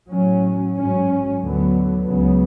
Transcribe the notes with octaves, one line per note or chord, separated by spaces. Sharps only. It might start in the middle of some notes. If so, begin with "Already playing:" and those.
A2 F#3 C#4
G#2 F#3 C#4
D2 D3 F#3 B3
C#2 C#3 F#3 B3